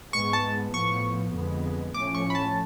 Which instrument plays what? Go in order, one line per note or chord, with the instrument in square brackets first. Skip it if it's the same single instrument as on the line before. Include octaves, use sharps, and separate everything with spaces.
[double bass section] G#2 G#3 B3 [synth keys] C#6
[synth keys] A5
[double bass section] A2 F3 B3 [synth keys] C#6
[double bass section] F2 D3 G#3 B3
[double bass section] A2 F3 A3 C#4 [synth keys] D6
[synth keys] C#6
B5
A5